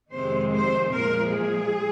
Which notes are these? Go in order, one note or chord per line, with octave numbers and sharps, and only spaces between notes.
F2 C3 D#3 G#3 C5
C5
A#2 F3 G#3 A#4
G#4